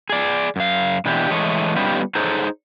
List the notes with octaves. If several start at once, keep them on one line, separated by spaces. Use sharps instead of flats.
G#4 D5
F#2 F5
B2 E3 D4 E4 G4
E3 G#3 A3 C#5 D#5
G3 B3 C#4 D#4 F4 G4
D#4 G#4 A4 C5 C#5